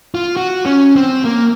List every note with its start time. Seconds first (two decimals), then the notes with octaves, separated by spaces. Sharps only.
0.15 F4
0.37 F#4
0.66 C#4
0.96 C4
1.25 A#3